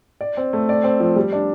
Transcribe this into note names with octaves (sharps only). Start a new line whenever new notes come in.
D5
C4
A3
D5
C4
F3
G3
D4